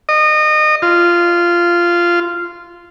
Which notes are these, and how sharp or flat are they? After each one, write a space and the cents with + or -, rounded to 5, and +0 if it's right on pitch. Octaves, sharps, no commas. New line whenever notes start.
D#5 -25
F4 -10